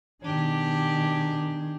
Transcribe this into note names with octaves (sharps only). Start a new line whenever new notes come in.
B2 D#3 D4 G4 G#4